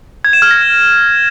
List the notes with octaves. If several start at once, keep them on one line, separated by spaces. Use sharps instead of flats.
G#6
E7
F6
A#6